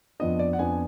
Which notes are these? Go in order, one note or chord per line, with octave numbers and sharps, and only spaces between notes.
F2 F3 B3 D4 D#5
D5
F#5
F2 F3 B3 D4 G#5